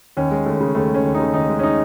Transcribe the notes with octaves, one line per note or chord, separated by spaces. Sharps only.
D#2 C#4
G#3
D#2 A3
C#3
D#2 A3
G#3 C#4
D#2
D#4
C#3
D#2 D#4
G#3
C#4
D#4